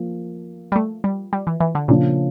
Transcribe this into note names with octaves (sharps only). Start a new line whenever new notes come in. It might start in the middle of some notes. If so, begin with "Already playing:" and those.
Already playing: F3 A#3
G3
A3
G3
G3
E3
E3
D3
A#2 C#3 F3 A#3 D4